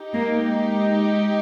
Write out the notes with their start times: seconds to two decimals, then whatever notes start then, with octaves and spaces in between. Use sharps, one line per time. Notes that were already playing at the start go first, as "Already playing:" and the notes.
Already playing: D#4 G4
0.14 A#3
0.43 G#3